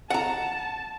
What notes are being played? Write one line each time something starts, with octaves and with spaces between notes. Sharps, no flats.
F#5 A5 A#5